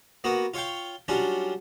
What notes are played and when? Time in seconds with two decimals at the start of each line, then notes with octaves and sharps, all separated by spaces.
0.24 A#3 B3 F#4
0.54 F4 C#5 F5 G5
1.08 F#3 G3 C#4 D4 F4